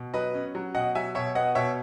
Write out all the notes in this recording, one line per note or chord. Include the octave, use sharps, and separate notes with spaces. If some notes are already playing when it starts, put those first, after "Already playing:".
Already playing: B2
F#3 B4 D#5
C#4
F#3
B2 D#5 F#5
F#3 E5 G#5
B2 C#5 E5
B3 D#5 F#5
B2 C#5 E5